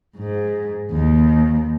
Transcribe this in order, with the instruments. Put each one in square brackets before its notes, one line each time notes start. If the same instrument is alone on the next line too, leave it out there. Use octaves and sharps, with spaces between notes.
[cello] G#2
D#2